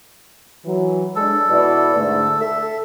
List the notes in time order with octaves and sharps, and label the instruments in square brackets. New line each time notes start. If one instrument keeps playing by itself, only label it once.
[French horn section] E3 F#3
[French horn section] G#3 D4 [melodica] A4
[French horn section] B2 E4 D5
G#2 D3 A3
[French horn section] A4 [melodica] E5